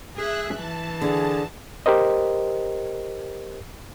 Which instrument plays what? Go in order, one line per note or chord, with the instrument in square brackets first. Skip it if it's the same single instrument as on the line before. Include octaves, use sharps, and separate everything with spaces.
[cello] G#4 [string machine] E5 F#6
[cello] E3 [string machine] A5
[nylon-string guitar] D3 [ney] G#4
[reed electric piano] G4 A#4 C5 D#5